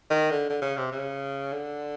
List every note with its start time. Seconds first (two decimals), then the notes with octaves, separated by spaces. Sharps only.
0.10 D#3
0.31 D3
0.50 D3
0.61 C#3
0.77 C3
0.92 C#3
1.53 D3